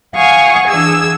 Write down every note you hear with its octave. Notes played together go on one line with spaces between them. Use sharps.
F5 F#5 G#5 C#6 D#6
E3 D4 G#4 E6